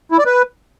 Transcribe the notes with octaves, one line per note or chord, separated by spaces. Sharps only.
E4
D5
B4